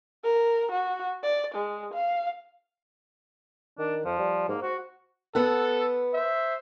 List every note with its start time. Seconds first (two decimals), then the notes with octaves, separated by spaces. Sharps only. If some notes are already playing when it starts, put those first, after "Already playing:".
0.24 A#4
0.72 F#4
1.23 D5
1.55 G#3
1.94 F5
3.79 D#3 D4
4.05 F2 F3
4.19 G3
4.49 G#2 A#3
4.63 F#4 C5
5.35 B3 A4 B4 F#5
6.14 C5 E5